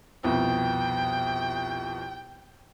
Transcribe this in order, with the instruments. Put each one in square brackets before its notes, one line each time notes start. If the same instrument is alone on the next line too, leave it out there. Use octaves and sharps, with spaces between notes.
[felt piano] C2 F2 B2 [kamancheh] G5